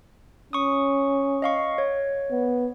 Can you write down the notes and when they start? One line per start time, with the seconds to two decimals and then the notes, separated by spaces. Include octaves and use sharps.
0.53 C#4 C#6 D#6
1.42 D#5 F5 C#6
1.78 C#5
2.31 B3